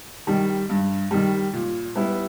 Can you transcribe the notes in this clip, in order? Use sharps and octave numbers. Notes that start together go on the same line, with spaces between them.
D#3 G3
G2
D#3 G3
A#2
G3 B3 E4